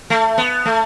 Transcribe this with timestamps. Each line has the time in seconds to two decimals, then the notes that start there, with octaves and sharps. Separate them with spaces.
0.10 A3
0.38 B3
0.66 A3